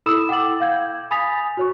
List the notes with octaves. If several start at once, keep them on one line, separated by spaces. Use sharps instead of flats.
E4 A4 B5 D#6 E6 E7
F#5 G5 D6 A6 F#7
F5 G6 G#6
G#5 B5 D#6 A6 B6 F7
F#4 C#5 C#6